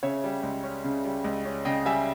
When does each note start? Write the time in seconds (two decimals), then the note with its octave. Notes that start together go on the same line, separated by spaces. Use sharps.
0.03 C#3 C#5 E5
0.24 G3
0.43 C#2
0.63 C#4
0.84 C#3
1.05 G3
1.24 C#2
1.45 C#4
1.65 C#3 D#5 G5
1.86 G3 E5 G#5